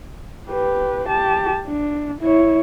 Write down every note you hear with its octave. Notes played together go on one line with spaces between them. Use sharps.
G4 B4
G4 A5
D4
E4 C#5